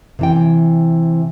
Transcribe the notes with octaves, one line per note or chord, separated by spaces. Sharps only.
C3 E3 G5